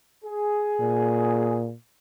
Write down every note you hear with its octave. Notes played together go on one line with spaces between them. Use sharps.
G#4
A#2